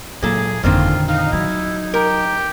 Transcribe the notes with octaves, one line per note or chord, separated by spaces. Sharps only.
A#2 F#3 G#4 A4
G1 F2 A#2 D3 D#3 C4 F4
D#4 F5
F#3 E4
G4 A#4